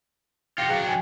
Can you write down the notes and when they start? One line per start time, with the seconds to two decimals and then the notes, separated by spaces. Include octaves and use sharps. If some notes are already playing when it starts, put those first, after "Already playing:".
0.58 F4 G4 G5 A#6 C#7
0.69 F#3 D4 G#4 F5 C#7
0.84 G5 G#5